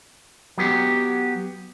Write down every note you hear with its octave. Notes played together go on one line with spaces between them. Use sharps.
F#3 B3 G4